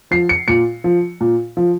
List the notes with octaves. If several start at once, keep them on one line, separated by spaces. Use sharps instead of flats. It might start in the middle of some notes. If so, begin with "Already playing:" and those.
F3 C7
C#7
A#2 C#7
F3
A#2
F3